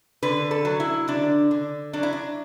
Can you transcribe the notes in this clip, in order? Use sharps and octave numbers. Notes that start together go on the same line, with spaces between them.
D3 B4
A4
F#3
E4
D3 D4
D3
F#3 D4
E4
D4